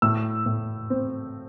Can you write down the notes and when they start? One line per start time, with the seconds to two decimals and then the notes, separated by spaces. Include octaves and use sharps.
0.02 A2 E6
0.46 A2
0.90 C4